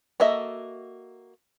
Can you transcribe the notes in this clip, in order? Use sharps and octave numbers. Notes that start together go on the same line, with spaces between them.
A#3 F#4 A4 D#5 E5